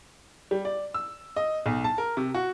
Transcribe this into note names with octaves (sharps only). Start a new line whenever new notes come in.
G3
D5
E6
D#5
B1
A5
A#4
C3
F#4